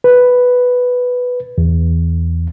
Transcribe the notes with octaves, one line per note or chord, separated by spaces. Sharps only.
B4
E2